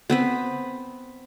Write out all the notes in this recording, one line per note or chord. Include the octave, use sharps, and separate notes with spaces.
B3 C4 B4